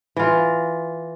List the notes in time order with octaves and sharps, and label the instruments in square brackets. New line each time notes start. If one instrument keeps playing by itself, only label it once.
[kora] E3 F4